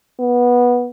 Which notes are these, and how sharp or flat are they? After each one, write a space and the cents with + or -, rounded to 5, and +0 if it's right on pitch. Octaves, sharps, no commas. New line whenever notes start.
B3 -15